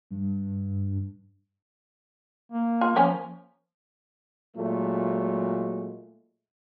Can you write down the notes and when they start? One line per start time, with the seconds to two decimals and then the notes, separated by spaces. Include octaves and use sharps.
0.11 G2
2.52 A#3
2.81 F4
2.96 F3 A#3 C#4 G#5
4.56 A#2 F#3 G#3 A3